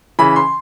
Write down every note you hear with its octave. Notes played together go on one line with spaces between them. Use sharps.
C#3 E3 B5
C6